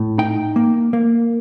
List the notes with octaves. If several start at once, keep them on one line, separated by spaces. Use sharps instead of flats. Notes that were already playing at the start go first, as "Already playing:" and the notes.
Already playing: A2
D#4 G5
A#3
A#3